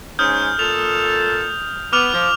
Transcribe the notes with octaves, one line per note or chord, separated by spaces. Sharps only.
G#2 C#4 D#6 F6 G6
A#2 A4 F7
B3 D6 F6 F7
F3